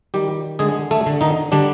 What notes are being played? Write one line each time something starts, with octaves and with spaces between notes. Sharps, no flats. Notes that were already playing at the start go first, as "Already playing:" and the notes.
D#3 G3 G4
D3 G#3 G#4
A3 A4
D3
D#3 D#4
D3 G3 D4